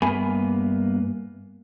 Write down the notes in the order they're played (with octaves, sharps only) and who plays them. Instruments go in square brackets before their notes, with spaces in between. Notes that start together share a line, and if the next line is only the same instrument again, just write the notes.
[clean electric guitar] G2 A#3 B3 E5 G#5 B5